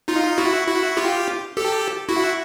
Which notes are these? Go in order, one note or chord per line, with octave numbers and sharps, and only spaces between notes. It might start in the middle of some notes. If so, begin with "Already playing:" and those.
D#4 F4
E4 F#4
E4 F#4
F4 G4
G4 A4
E4 F#4